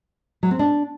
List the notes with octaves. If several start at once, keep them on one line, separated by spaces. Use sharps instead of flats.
F#3
C4
D4